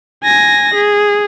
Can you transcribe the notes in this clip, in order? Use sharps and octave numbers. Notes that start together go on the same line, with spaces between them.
G#5 A#6
G#4